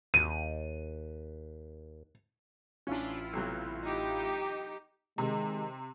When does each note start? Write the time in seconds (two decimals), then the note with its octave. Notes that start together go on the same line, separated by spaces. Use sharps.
0.14 D#2 D#7
2.87 A1 C#4 D4 E4 F4
3.33 B1 C3 F#3
3.83 D#4 G4
5.18 C3 D#3 G#3